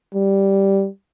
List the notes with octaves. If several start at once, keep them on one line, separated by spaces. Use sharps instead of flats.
G3